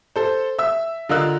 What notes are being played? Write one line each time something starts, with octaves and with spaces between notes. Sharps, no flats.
A4 C5
E5 E6
D3 F4 A#4 D#5 E6 F#6